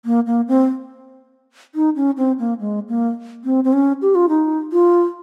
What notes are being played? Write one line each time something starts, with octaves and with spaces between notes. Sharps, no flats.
A#3
A#3
C4
D#4
C#4
C4
A#3
G#3
A#3
C4
C4
C#4
G4
F4
D#4
F4